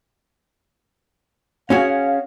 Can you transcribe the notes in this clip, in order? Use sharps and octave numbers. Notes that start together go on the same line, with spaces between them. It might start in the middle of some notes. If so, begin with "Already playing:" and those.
C#4 F#4 G#4 F5